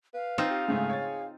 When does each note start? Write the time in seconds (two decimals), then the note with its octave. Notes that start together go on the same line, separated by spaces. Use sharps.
0.14 B4 F5
0.38 C4 D#4 F4 F6 C7 E7
0.50 G4
0.68 G#2 C#3 A3 G#4
0.90 C#5 A6